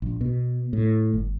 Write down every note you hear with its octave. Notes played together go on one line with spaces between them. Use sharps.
A#1
B2
A2
G1